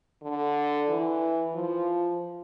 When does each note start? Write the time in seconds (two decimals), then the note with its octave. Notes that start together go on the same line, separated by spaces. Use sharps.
0.22 D3
0.89 E3
1.55 F3